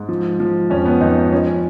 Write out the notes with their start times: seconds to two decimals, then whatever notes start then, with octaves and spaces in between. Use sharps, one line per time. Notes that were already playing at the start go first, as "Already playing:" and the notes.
Already playing: G#2
0.09 F3
0.40 F3
0.70 F2 C#4
0.85 B3
1.01 F2 D#4
1.17 D#4
1.32 F3 C#4
1.47 C#4